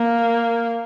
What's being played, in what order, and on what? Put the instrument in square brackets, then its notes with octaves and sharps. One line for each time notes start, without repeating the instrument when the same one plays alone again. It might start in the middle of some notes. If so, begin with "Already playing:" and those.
Already playing: [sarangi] A#3